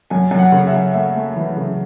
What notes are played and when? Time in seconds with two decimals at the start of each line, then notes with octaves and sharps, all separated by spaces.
0.10 F#2 G#5
0.31 F#2
0.39 F#5
0.52 C#3
0.67 E5
0.73 F#2
0.94 A3 E5
1.16 A3
1.36 E3
1.57 C#3